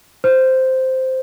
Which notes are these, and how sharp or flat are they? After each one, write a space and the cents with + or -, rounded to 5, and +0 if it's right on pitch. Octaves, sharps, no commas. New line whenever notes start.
C5 -5